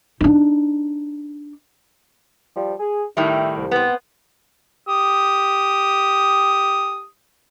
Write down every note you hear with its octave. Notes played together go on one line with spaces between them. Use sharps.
D4 D#4
F3 G3
G#4
A2 D#3 G3 E5 G5
C2
B3 C4
G4 D#6